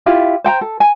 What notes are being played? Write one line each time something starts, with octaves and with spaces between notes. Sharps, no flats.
E4 F4 G4 E5
C5 G5 A#5
A4
G#5